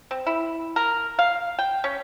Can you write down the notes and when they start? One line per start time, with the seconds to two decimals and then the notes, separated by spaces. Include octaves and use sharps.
0.11 C4
0.27 E4
0.76 A#4
1.19 F5
1.59 G5
1.84 C#4